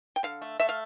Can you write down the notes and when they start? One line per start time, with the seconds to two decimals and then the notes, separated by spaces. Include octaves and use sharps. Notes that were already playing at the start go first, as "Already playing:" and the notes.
0.16 G5
0.23 D3 F5
0.42 A3
0.60 A3 E5
0.69 F5